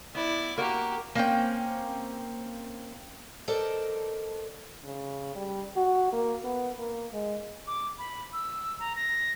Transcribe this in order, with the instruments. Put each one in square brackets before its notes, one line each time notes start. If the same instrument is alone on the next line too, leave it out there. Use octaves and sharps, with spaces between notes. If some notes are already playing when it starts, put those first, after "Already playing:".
[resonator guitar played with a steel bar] B3 [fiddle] E4 D5
[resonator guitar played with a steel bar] A#3 A#4 [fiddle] F#4 G4
[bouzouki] A#3 C4 C#4 G5
[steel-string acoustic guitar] A4 A#4 C5 D5 D#5 A5
[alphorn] C#3
G3
F#4
A#3
B3
A#3
G#3
[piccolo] D6
B5
E6
A#5
A#6